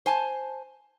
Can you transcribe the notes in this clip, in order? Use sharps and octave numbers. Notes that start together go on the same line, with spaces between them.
C5 G#5 A5